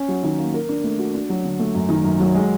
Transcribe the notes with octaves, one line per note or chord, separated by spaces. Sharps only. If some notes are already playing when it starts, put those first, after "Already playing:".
Already playing: C#4
F#3
D#3
A#3
A#4
D4
A3
F#4
D4
F#3
D3
A3
F#2
D#3
F#2
F#3
G#3